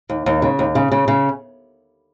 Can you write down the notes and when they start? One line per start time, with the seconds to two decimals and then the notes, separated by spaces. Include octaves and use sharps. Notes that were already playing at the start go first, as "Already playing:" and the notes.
0.10 D#2
0.26 D#2
0.42 C#3
0.59 D#2
0.75 C#3
0.92 C#3
1.08 C#3